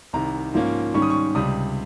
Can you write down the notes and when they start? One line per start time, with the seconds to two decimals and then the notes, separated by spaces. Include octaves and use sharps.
0.13 C2 C3 D#3 A#5
0.54 G#2 F3 A#3 C#4
0.94 G#2 D#3 G3 C#4 C#6
1.02 D#6
1.10 C#6
1.35 C#2 C3 G3 D#6